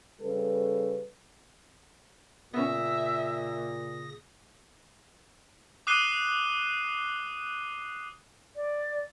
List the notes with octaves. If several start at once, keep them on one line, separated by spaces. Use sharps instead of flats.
C#3 G3 A4 B4
A#2 C#3 B3 C#4 E5 D#6 A#6
D6 D#6 F#6 C7 D#7 G7
D5